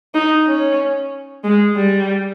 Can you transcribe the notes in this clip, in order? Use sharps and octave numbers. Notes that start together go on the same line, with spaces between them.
D#4
C#4
G#3
G3